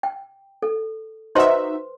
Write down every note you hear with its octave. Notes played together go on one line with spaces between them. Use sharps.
G5
A4
D#4 F#4 B4 C5 E5 C6